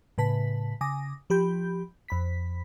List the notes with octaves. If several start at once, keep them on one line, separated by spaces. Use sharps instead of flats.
A2 C#3 B4 A5 B6
C#3 G#5 D6 D#6 A#6
F3 G4 B5 G6
F2 B5 B6